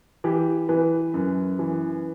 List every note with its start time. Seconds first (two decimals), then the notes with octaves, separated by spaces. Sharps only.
0.24 E3 G4
0.69 E3 B4
1.14 F#2
1.59 E3